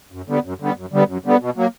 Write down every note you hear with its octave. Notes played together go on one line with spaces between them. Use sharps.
F#2
D3 G3 B3
F#2
D3 G3 B3
F#2
D3 G3 B3
F#2
D3 G3 B3
B2
F#3 A#3